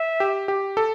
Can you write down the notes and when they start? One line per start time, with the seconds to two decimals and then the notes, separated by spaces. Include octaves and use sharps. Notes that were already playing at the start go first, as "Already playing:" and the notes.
Already playing: E5
0.20 G4
0.48 G4
0.77 A4